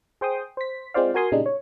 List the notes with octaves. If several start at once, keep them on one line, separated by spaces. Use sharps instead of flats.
G#4 C5 G5 C6 D#6
C5 B6
G#3 C4 F4 C5 D5 F5
F#4 A#4 G#5 C6 D#6
A#2 C#3 G3 G#3 D4 D#4
C#5